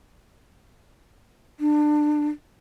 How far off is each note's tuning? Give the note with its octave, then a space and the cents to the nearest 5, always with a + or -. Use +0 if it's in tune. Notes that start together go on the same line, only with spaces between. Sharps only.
D4 +25